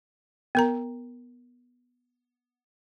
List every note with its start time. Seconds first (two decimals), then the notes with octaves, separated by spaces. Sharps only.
0.55 B3 A#4 A#5